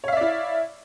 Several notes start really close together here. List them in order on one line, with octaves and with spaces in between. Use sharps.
C#5 F5 E5 D5 E4